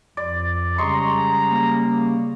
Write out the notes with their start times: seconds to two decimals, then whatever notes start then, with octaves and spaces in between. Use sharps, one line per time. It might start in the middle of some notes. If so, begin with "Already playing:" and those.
0.17 F2 D5
0.78 C#3 G3 G#3 D#5 A#5 C6 C#6
1.50 A#3